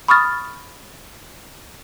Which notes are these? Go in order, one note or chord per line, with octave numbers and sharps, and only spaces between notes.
B5 C#6 D#6 F6 A6